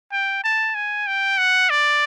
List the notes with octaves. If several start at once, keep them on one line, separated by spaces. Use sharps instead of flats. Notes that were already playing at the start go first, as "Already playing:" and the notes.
G5
A5
G#5
G5
F#5
D5